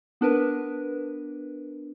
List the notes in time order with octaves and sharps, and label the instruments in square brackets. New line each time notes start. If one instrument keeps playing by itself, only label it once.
[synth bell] B3 D4 A#4 B4